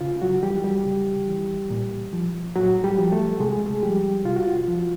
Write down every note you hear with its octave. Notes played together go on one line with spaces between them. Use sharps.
C#3 F4
F#3 F#4
E3 G3 G4
G3 G4
C#3
E3
A#2
F3
A#2 F#3 F#4
G3 G4
F3
A3 A4
C3 G#3 G#4
F3 G3 G4
C3 F4
F#4
F4
F3